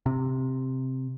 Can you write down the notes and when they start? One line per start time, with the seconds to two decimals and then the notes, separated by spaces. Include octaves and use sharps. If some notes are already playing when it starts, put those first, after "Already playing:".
0.06 C3